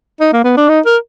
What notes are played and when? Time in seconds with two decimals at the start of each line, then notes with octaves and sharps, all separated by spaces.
0.21 D#4
0.33 A#3
0.44 B3
0.57 D4
0.69 D#4
0.86 A#4